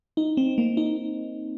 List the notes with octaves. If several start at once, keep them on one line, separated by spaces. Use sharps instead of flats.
D#4
C4
A#3
D#4